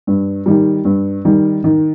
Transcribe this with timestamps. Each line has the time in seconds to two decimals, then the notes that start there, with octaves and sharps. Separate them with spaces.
0.07 G2
0.46 D#3 G3
0.85 G2
1.25 D#3 G3
1.64 D#3